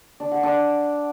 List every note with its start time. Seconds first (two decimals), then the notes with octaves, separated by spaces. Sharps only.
0.20 D4
0.32 F#5
0.43 D4